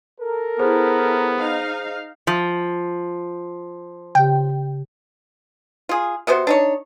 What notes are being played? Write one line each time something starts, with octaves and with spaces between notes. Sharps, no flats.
A4 A#4
B3 E4 G#4 C5
D#4 F5
F3
C#3 G4 G5
F4 G#4
C3 B3 F#4 C5
D4 D#4 C#5